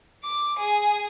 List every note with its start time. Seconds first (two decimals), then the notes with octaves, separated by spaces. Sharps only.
0.23 D6
0.59 G#4